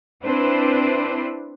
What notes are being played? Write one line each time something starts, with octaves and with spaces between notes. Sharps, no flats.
C4 D4 E4 B4 C5